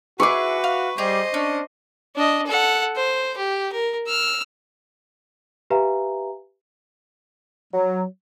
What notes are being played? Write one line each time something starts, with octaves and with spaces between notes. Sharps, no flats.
E4 F#4 G#4 B4 C#6 D6
F5
G3 G4 G#4 C5 D#5
C#4 D4
D4 D#5
A4 F#5
C5
G4
A#4
E6 F6
G4 B4 E5 F5 G#5 A#5
F#3